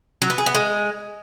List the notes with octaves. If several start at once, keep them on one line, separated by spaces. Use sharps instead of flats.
F#3
B3
G#4
B3
G#3